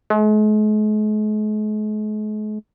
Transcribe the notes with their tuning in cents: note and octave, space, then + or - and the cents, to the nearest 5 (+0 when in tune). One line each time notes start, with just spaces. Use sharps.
G#3 +45